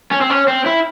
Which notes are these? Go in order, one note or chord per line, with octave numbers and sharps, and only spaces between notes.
C#4
C4
C#4
C4
E4